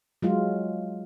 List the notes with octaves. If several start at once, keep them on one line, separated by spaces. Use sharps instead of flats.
F#3 G#3 F4